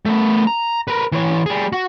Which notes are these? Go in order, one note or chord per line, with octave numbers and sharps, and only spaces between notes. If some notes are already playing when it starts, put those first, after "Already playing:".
A3 B3
A#5
A#4 B4
E3 C#5
G3 G#4
F#4